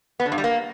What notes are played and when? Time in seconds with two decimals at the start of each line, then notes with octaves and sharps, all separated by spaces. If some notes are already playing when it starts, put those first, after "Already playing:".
0.20 B3
0.26 D3
0.32 G2
0.38 G3
0.44 A#3